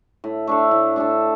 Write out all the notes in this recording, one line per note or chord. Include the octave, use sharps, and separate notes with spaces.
A2
A3 D4 A4
A2
A3 D4 A4